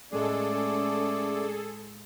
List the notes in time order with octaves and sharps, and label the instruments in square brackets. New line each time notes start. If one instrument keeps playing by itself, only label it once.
[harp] A2 G#3 [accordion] A3 D5 [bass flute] C#4 [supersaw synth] G#4 A4